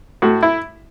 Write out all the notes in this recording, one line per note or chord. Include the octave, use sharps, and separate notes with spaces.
A2 F#4
E4